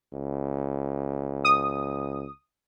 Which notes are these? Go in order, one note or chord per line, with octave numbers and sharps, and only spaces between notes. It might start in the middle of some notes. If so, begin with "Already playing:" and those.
C#2
D#6